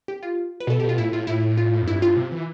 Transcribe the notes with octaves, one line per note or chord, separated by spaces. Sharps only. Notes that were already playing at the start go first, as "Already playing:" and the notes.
G4
F4
B4
B2 A4
B2 G4
F4
A2 E4
A2 F4
A2 E4
F4
F2
G2 E4
F4
C3
E3